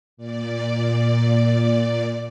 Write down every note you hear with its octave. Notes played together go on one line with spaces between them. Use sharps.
A#2 D5